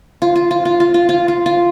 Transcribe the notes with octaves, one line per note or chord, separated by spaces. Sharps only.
F4
F4
F4
F4
F4
F4
F4
F4
F4